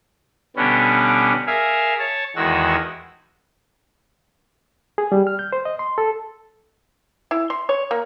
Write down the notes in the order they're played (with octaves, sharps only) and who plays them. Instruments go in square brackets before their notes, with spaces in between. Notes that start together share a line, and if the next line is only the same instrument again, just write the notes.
[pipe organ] B2 D3 G3 B3 C#4
G#4 A#4 E5 F5
C#5 A5
E2 D#3 G#3 F#4 E6
[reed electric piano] G#4
G3
F6
G6
C5
D#5
C6
A4
[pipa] E4
C6
C#5
A#3